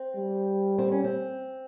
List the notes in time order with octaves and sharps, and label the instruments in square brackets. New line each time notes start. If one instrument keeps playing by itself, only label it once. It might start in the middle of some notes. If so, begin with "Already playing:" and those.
Already playing: [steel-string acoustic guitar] C4
[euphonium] G3
[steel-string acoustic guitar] C4
C#4
C4